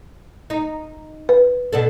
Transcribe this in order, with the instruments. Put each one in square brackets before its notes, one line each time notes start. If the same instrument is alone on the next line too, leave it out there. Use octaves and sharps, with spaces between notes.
[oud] D#4
[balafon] B4
[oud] B2 D4 A4